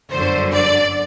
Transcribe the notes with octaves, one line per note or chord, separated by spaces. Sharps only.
G1 F#2 D3 F#3 C5
D5